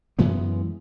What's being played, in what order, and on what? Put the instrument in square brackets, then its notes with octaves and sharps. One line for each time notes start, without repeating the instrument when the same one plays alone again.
[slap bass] F#2 E3 G#3 B3